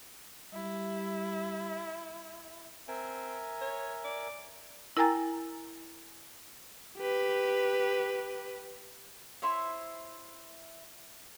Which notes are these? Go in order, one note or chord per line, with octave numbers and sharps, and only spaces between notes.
G3 E4
C4 A#4 E5 G#5
C#5
D5
E4 A#4 G5 G#5 A#5 A6
G4 B4
E4 C5 C#5 E5